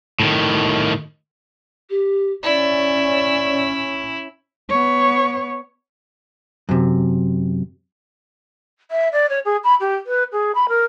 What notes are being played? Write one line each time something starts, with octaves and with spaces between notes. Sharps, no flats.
A2 D#3
G4
C#4 E4 D5
B3 C#5
F#2 C3
E5
D5
C#5
G#4
B5
G4
B4
G#4
B5
A#4